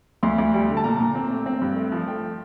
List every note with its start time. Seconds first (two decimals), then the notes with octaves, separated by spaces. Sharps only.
0.23 D2 C6
0.38 D2
0.53 G3
0.69 D3
0.77 A5
0.84 A#2 A#5
1.00 A#2
1.15 C4
1.30 A3
1.46 C4
1.61 G2
1.76 A3
1.92 F3
2.07 A3 G5